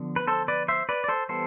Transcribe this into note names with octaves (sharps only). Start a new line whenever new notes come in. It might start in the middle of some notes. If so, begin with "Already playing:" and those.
Already playing: D3 F3 B3
B4
A4 C5
B4 D5
C5 E5
B4 D5
D5
A4 C5
E3 G3 B3 A4 C5